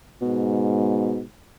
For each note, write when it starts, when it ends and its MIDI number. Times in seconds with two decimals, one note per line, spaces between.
0.22 1.26 44
0.22 1.23 47